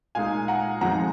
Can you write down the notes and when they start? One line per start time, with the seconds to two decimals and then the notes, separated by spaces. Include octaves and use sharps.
0.15 A#2 G#3 D#4 F5 G#5
0.48 F#5 A#5
0.81 F2 F3 G#3 D#4 F#5 A#5